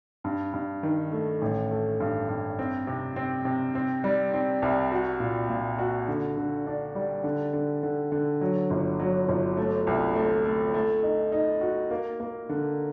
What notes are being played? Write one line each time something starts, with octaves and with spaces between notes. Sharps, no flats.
G2
G2
D#3
A3
A1
A3
G2
G2
C4
C3
C4
C3
C4
G3
C4
C2
F#4
A#2
A#2
F#4
D3
D3
D4
G3
D3
D3
D3
D3
F#3
G1
F#3
G1
A3
C2
A3
A3
A3
D#4
D#4
F#4
A#3
A#3
D3